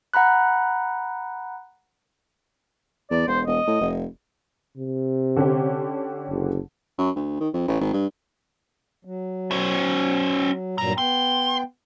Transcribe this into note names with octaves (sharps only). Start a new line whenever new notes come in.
F#5 A#5 B5 F#6
E2 D5
E1 C5
E1 D#5
A2
F1
C3
D3 C#4 G4
F#1
F#2
D2
D#3
F2
A1
G#1
G2
F#3
C#4 C5
G2 A#2 F#3 C4 A#5
B3 G5 C6